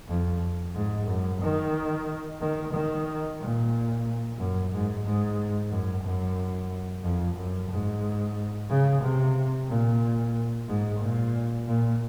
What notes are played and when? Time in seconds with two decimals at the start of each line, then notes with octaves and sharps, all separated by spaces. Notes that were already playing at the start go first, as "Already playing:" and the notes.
0.08 F2
0.75 G#2
1.07 F#2
1.41 D#3
2.41 D#3
2.74 D#3
3.40 A#2
4.39 F#2
4.72 G#2
5.05 G#2
5.71 F#2
6.04 F#2
7.03 F2
7.36 F#2
7.70 G#2
8.69 C#3
9.03 C3
9.68 A#2
10.68 G#2
11.00 A#2
11.67 A#2